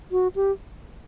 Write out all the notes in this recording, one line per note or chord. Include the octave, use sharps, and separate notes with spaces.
F#4
G4